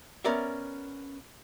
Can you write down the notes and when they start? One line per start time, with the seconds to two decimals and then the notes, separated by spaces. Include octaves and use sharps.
0.25 B3 C#4 A#4 D5 E5